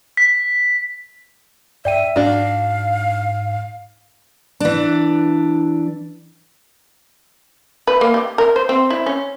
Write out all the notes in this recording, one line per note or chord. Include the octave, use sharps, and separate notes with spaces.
B6
G2 D5 E5 G5 D#7
G#2 D4 F#4 F5
E3 D4
B4
A#3
G4
A#4
C5
C4
E4
C#4